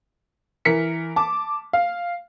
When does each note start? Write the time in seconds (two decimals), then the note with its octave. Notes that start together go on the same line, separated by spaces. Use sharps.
0.65 E3 A#4 B6 C#7
1.16 A5 D6
1.73 F5